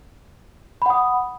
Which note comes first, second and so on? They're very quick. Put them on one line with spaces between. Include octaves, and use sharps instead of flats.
B5 F#5 D#6